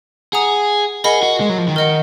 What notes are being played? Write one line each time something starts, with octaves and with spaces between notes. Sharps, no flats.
G#4 F#5 A#5 D#6
G#4 A#4 D#5 F#5 B5
F#4
G#3
F#3
F3
D#3
A#4 D#5 F#5